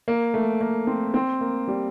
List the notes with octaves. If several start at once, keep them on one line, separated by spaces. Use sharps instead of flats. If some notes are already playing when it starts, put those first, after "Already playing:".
A#3
A3
A#3
C4
C4
A#3
G3